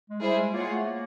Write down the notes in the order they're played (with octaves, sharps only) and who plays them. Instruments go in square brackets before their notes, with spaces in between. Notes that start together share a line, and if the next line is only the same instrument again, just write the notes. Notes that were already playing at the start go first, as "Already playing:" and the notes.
[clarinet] G#3
[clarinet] G3 [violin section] E4 G#4 C5
[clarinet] G#3
[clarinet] A#3 [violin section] F4 G#4 C#5 F#5
[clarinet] A3
A#3